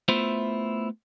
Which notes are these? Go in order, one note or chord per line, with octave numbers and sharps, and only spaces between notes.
A3 B3 E4 F4 C5 E5